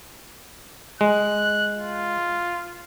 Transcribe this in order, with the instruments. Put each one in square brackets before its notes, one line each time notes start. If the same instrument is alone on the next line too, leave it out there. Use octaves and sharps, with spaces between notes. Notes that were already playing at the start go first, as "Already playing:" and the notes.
[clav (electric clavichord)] G#3 [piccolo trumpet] F#6
[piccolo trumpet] F4